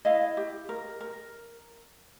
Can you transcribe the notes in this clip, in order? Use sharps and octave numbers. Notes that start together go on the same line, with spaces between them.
E4 D#5 F5
G4
A#4
A#4